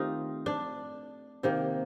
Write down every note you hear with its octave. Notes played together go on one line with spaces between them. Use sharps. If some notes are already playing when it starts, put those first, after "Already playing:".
Already playing: D#3 A3 C4 D#4 F4 G4
D4
C3 D#3 A#3